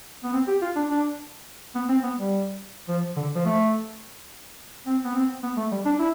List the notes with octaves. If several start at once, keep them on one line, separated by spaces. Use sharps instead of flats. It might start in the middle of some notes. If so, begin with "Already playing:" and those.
B3
C4
G4
F4
D4
D4
B3
C4
B3
G3
F3
D3
F3
A3
C4
B3
C4
B3
A3
G3
D4
E4